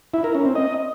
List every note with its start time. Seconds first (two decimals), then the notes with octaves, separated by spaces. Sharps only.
0.14 E4
0.24 A#4
0.35 C#4
0.45 C4
0.56 D#5